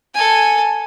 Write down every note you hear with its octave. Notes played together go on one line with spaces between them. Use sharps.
A4 G#5